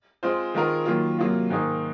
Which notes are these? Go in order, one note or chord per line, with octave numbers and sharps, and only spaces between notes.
G#3 C4 F4 C5
D#3 G#3 C4 F4 A#4
D#3 F#3 A#3 F4
C3 F#3 A#3 F4
G#2 D#3 A#3 D#4